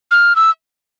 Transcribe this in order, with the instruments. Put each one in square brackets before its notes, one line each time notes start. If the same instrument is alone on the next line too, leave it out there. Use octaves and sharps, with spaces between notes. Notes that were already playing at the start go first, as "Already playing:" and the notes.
[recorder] F6
E6